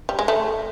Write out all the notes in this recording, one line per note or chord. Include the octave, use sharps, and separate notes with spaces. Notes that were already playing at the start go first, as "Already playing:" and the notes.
G3
G#3
A3